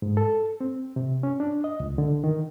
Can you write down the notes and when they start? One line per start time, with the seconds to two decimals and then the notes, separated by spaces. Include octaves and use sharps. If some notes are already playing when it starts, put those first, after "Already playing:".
0.02 G#2
0.17 A4
0.61 C4
0.96 C3
1.23 C#4
1.40 D4
1.64 D#5
1.80 C#2
1.98 D3
2.24 D#3